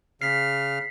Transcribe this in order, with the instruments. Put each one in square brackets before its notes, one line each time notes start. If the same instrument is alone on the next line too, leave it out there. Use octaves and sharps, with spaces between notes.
[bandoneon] C#3 F6 [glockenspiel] B6 C7